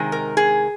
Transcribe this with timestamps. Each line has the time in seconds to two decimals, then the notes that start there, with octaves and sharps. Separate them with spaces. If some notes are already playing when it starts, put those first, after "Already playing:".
Already playing: C3 D#3 G#3
0.12 A#4
0.37 G#4